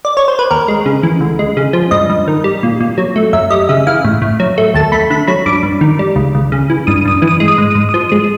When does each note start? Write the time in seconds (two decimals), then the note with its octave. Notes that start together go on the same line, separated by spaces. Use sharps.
0.05 D5
0.17 C#5
0.28 C5
0.39 B4
0.51 D#2 A#4
0.68 G#3
0.86 C#3
1.03 E3
1.21 D2
1.39 G#3
1.57 C#3
1.73 F3
1.91 G2 D#5
2.10 G2
2.28 D#3
2.44 G3
2.63 A#2
2.80 A#2
2.98 F#3
3.16 A3
3.33 F#2 E5
3.50 G3 D#5
3.69 C#3 E5
3.87 E3 F5
4.05 A2
4.22 A2
4.40 F#3
4.58 A3
4.74 D#2 A5
4.92 A3 B5
5.10 D3 B5
5.28 F#3 B5
5.46 G2 D6
5.63 G2
5.81 D#3
5.99 G3
6.16 C#2
6.35 C#2
6.52 C#3
6.70 E3
6.87 G2 D#6
7.05 G2 D#6
7.22 E3
7.27 D#6
7.40 G#3
7.48 D#6
7.58 G#2
7.70 D#6
7.75 G#2
7.89 D#6
7.94 F3
8.09 G#3 D#6